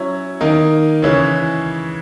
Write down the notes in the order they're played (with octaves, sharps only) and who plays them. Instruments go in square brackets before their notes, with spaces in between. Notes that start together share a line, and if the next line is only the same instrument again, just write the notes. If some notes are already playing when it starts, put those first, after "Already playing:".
Already playing: [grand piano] F#3 C#4 E4
D#3 A#3 D#4
C#3 E3 G#3 C#4 E4